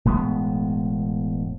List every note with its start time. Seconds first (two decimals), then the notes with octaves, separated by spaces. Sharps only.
0.05 E1 A2 G#3 B3